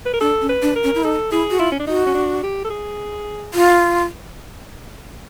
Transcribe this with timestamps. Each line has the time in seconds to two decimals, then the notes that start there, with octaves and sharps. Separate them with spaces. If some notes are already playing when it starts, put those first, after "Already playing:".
0.06 B4
0.13 A#4
0.20 D4 A4
0.41 C#4
0.49 B4
0.62 D4
0.76 A#4
0.84 C#4
0.95 E4
1.04 D#4 A4
1.31 E4 G#4
1.50 F#4
1.59 E4 F4
1.72 C#4
1.80 D4
1.87 D#4 F#4
2.07 C#4
2.14 D4
2.43 G4
2.64 A4
2.70 G#4
3.54 F4